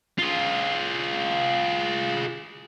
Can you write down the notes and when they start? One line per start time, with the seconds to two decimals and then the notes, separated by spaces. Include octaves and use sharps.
0.19 F4 G#4